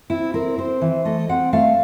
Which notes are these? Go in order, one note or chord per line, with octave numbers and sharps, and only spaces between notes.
C4 E4
C4 A#4
C4 C5
E3
A3 D#5
C4 F#5
A3 F5